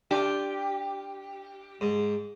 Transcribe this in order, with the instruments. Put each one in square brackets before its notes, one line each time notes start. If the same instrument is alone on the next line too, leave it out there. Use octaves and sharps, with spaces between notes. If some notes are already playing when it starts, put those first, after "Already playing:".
[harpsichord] D4 F4 [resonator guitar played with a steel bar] G4
[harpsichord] G#2